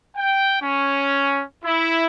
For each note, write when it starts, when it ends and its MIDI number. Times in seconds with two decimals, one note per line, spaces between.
0.17 0.59 79
0.61 1.42 61
1.64 2.06 64